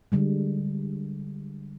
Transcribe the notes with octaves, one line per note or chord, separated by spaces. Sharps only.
D3 G3 G#3